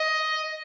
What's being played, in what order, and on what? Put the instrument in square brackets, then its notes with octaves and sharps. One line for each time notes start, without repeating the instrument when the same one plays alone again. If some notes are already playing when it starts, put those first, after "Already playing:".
Already playing: [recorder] D#5